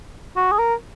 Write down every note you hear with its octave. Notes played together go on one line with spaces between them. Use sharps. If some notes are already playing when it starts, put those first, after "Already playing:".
F#4
G#4
A#4